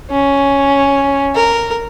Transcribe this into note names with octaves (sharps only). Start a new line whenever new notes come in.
C#4
A#4